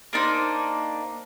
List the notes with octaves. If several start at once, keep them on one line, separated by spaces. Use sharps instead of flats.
A#3 D4 D#4 C5